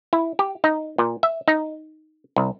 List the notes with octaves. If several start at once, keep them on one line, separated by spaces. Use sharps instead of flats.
E4
G4
D#4
A#2
E5
D#4
C2